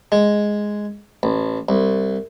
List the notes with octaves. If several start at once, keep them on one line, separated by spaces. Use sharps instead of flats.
G#3
A1
C2